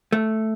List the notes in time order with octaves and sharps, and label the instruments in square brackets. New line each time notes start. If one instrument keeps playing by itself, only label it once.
[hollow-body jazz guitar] A3